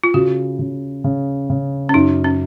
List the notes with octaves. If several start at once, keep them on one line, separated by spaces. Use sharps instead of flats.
F4
C#3 F#4
C#3
C#3
C#3
C#4
F#2 D#4
C#4